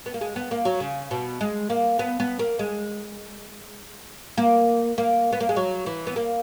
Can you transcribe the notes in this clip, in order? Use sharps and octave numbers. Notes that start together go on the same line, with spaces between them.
B3
A#3
G#3
B3
A#3
F#3
C#3
B2
G#3
A#3
B3
B3
A#3
G#3
A#3
A#3
B3
A#3
G#3
F#3
E3
B3
A#3